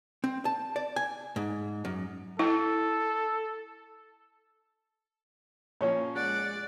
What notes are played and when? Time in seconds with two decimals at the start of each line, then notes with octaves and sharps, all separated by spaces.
0.24 C4
0.45 A5
0.76 D5
0.96 G#5
1.36 G#2
1.85 F#2
2.39 E4 A4
5.81 A#2 F3 C#4 C#5
6.16 G#3 D5 F#5